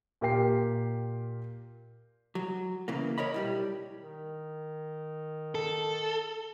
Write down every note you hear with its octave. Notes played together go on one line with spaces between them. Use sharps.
A#2 G4 A#4 G5 C7
F#3
C#3 E3 A#3
A#4 C#5 D#5 B5
B1 G3 E4
D#3
A4